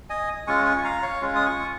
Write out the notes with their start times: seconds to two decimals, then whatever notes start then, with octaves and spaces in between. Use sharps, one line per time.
0.10 D#5 G#5
0.47 G#3 C#4 F4 G#5 C#6
0.66 G#5 C#6
0.79 C#6
0.84 F5 A#5
1.02 C#5 F5
1.21 G#3 C#4 F4
1.36 D#6
1.46 G#5 C#6